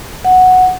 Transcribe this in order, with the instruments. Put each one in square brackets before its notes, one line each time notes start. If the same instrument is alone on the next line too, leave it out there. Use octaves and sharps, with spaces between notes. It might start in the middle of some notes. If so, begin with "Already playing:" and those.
[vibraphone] F#5